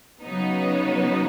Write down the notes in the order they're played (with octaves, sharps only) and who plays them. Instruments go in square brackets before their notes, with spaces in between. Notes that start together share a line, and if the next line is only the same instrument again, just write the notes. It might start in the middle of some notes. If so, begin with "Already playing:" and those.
[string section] C#3 F#3 B3 D#4